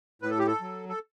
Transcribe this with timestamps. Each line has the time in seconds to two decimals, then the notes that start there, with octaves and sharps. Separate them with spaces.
0.22 A2 B4
0.30 A4
0.39 G4
0.47 A4
0.61 F#3
0.89 A4